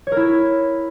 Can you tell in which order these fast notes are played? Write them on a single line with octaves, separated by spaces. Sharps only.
C#5 A#4 E4